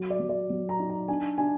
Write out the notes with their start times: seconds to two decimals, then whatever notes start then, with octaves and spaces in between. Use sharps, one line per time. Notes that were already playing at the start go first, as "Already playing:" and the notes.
Already playing: F#3
0.10 D5
0.20 F#3
0.29 D5
0.50 F#3
0.69 A#5
0.79 D#4
0.90 A#5
1.08 D4 G#5
1.38 D4 G#5